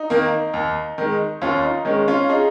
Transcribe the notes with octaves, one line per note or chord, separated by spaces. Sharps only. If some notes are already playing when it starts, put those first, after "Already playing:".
Already playing: D#4
D#3 A#3
D#2
D#3 G#3
D#2 C#4 F4
D#4
D#3 G#3 C#4
C#4 F4
D#4 G#4